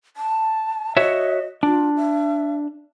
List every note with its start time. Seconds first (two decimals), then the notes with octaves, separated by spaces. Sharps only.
0.17 A5
0.97 F#4 C#5 D#5 E5
1.63 D4 F4
1.96 E5